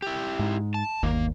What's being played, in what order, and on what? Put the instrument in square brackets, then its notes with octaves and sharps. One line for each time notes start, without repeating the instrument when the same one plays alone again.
[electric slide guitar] E4 G4
[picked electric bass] G#2
[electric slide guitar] A5
[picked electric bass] G1 D#2 [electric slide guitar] A#3